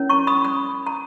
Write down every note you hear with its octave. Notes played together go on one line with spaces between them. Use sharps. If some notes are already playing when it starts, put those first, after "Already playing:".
Already playing: C#4 E4 A#4 C#5
A#5 C#6
B5 D#6
B5 D#6
A#5